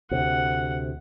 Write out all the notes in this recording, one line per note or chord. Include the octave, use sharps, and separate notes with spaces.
D2 C3 F#5